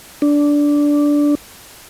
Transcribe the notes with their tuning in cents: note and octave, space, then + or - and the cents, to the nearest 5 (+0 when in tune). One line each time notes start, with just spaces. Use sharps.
D4 -10